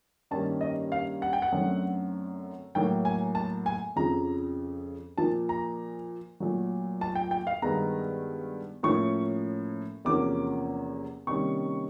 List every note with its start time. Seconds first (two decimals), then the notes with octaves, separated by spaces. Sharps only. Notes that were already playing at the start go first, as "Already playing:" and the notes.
0.31 G2 D#3 G3 A#3 C#4 A5
0.61 D#5
0.92 F5
1.22 F#5
1.33 G5
1.42 F#5
1.52 F#2 D3 F#3 A3 C4
2.75 A2 F#3 A#3 G5
3.05 G#5
3.35 A5
3.66 G#5
3.96 F2 C#3 F3 A#5
5.18 A#2 F3 A#3 A5
5.49 A#5
6.40 A#2 F#3 A3
7.01 A5
7.15 G5
7.31 G5
7.47 F5
7.62 G2 D#3 G#3 B3 A#5
8.83 A2 F3 A#3 C#4 C#6
10.05 E2 C3 F3 A#3 C#4 D6
11.27 C3 D#3 G3 A#3 C#4 C#6